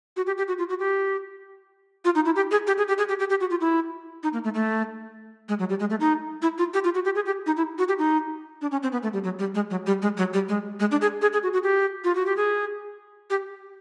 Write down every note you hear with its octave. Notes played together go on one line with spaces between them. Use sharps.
F#4
G4
G4
F#4
F4
F#4
G4
F4
D#4
E4
G4
G#4
G4
G#4
G4
G#4
G4
G4
G4
F#4
F4
E4
D#4
A#3
A3
A3
G#3
F#3
G3
G#3
A3
D#4
E4
F4
G4
F4
F#4
G4
G#4
G4
D#4
E4
F#4
G4
D#4
D4
C#4
C4
B3
A3
G3
F#3
G3
G#3
F#3
G3
G#3
F#3
G3
G#3
G#3
D4
G#4
G#4
G#4
F#4
F#4
G4
F4
F#4
G4
G#4
G4